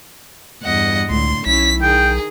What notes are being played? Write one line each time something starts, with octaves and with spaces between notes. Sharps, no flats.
E2 G2 D#5 F#5
C#2 A2 D3 C6
B1 C#4 E4 B6
D#3 G#4 G5